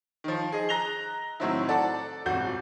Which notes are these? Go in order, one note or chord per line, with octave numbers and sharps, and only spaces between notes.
D#3 F3
G#4 D#5
A#5 F#6 A#6 F7 G7
A2 D#3 F#3 C4 D#4 E4
A4 D5 F#5 A5
D#1 G#1 F#4 G6